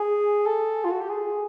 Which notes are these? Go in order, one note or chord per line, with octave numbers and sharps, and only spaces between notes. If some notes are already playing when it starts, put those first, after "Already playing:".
Already playing: G#4
A4
F4
F#4
G4
G#4